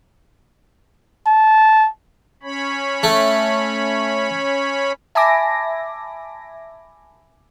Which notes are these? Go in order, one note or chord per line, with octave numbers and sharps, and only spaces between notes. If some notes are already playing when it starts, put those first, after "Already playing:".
A5
C#4 C#5 B5
A3
E5 G#5 A5 B5 D6 A#6